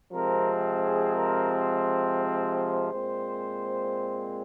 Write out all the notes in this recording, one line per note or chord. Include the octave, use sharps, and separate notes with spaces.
C3 F3 G#3 C4 A#4
G#4
A#4
C5
A#2 G#3 C4